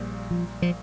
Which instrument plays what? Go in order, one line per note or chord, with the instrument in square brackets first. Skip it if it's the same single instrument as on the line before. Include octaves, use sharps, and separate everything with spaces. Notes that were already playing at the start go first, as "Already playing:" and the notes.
Already playing: [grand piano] A#1 A#2 G3 A#3
[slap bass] F3
F3